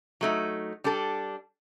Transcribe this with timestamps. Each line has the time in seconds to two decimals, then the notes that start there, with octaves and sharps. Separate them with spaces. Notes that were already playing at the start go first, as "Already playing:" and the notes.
0.21 F#3 A3 D#4
0.84 G3 D4 A4